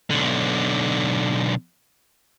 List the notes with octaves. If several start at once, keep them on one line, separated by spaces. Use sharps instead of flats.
B1 D3